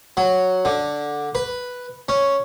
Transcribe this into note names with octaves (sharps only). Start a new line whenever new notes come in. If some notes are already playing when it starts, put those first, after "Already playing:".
F#3
D3
B4
C#4